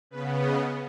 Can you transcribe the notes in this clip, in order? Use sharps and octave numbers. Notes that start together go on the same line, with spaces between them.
C#3 B3 B4
D#5